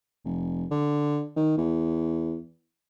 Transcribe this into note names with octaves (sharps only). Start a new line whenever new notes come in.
F1
D3
D#3
E2